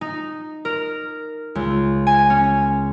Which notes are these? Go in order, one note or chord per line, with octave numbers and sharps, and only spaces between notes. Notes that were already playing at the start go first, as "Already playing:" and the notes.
D#4
A#4
C#2
G#5
C#4